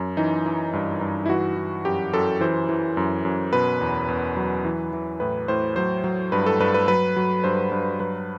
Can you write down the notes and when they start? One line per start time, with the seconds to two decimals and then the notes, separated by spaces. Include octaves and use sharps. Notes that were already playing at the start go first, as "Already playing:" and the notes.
Already playing: F#2
0.17 E3 D#4
0.46 E3
0.73 G2
1.01 G2
1.26 E4
1.29 E3 F#4
1.57 E3
1.85 F#2 G4
2.13 F#2 A4
2.41 E3 C5
2.69 E3
2.97 F#2
3.25 F#2
3.53 B2 B4
3.81 E2
4.08 E2
4.37 F#3
4.65 E3
4.93 E3
5.20 A2 B4
5.48 A2 C5
5.76 F#3 C5
6.04 F#3
6.32 G2 B4
6.46 A4
6.60 G2 B4
6.74 B4
6.88 F#3 B4
7.16 F#3
7.44 G2 C5
7.72 G2
8.00 F#3 B4